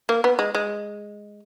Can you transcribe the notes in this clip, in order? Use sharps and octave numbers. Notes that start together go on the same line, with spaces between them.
A#3
B3
G#3
G#3